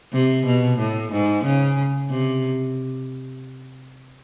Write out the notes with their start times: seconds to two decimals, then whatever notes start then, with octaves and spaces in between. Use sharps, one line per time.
0.13 C3
0.46 B2
0.79 A2
1.12 G#2
1.44 C#3
2.10 C3